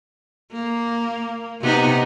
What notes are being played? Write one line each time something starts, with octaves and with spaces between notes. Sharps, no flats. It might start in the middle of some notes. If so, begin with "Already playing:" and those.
A#3
C3 B3 D#4